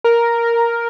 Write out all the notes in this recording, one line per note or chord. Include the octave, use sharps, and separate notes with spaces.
A#4